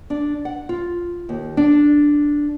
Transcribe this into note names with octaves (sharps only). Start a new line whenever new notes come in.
D4
F#5
F4
D#2
D4